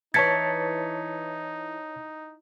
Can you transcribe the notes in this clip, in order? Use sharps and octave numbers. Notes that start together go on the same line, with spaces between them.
E3 D#4 C#5 A5 G#6 A6 B6 C#7